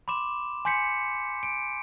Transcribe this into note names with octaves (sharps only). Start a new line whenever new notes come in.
B5 C6 D6 E7
G#5 C6 G6 B6 C#7
D7